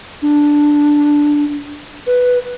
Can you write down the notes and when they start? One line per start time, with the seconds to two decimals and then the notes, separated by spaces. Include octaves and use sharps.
0.22 D4
2.07 B4